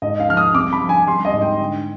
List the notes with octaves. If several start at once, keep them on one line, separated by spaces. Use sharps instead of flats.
G#2 D#5
F5
F3 F6
D#6
C2 D6
B5
F3
G#5
G3 C6
D#5
G#2
G5
D3